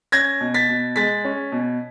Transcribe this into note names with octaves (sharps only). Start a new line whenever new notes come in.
C#4 G#6 A#6
B2
A6 B6
B2
G#3 A6 B6
C#4
B2